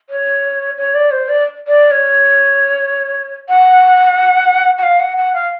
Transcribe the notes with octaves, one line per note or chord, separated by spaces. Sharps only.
C#5
C#5
D5
C5
D5
D5
C#5
F#5
F#5
F5
F#5
F#5
F5